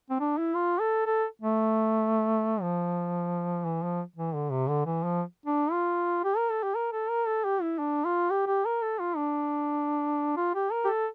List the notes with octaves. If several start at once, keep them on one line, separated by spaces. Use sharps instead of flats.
C4
D4
E4
F4
A4
A4
A3
F3
E3
F3
E3
D3
C3
D3
E3
F3
D4
F4
G4
A#4
A4
G4
A#4
A4
A#4
A4
G4
E4
D4
F4
G4
G4
A#4
A4
F4
D4
F4
G4
A#4
G4
A4